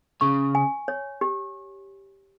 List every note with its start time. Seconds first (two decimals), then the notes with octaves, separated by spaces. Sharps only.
0.21 C#3 C#6
0.55 G#5
0.88 C#5
1.21 G4